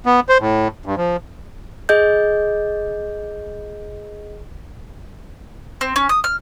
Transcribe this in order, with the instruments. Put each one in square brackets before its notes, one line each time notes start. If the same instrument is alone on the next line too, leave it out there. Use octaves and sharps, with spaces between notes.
[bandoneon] B3
C5
A2
G2
F3
[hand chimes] G#4 D#5 G6
[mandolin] C4
C#4
D#6
F6